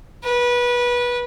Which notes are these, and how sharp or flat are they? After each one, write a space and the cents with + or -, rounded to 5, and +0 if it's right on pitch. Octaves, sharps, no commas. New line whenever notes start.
B4 -25